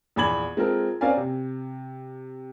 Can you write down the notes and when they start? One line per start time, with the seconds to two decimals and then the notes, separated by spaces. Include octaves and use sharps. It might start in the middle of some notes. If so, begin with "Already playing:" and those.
0.16 A#1 E2 B5 G#6 F#7
0.57 G#3 C4 F4 A4 A#4
1.01 C4 C#4 A#4 D5 F5 G#5
1.17 C3